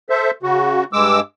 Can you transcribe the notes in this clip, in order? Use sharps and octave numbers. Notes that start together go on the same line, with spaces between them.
A4 C5 E5
C#3 F#4
G2 G#3 D6 E6